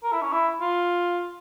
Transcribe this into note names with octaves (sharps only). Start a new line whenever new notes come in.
A#4
E4
C#4
E4
F4